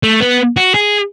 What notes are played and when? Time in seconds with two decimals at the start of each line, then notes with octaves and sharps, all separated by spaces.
0.03 A3
0.21 B3
0.57 F#4
0.74 G#4